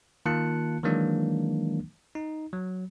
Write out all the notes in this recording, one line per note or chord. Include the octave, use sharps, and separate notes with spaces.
D#3 A#3 F4 A5 F#6 C#7
D#3 E3 F#3 G#3 A#3 D4
D#4
F#3